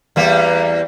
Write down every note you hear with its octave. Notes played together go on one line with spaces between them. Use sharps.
E2 G3 A#3